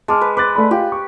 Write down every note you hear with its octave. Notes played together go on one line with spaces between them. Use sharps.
G#3 A5 D6 F6
B4
B4 D6 F#6 A6
A3 D5 B5
F4 G4
C#6